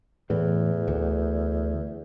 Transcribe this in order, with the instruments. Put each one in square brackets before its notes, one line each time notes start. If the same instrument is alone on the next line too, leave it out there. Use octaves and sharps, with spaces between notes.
[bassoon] E2 [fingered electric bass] A2 E3
[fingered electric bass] D2